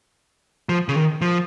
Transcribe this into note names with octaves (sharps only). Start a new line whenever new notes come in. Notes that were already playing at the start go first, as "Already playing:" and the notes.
F3
C#3
D#3
F3